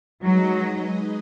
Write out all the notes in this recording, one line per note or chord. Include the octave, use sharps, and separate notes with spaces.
F#3 G#3 D#4 G#4 B4 D#5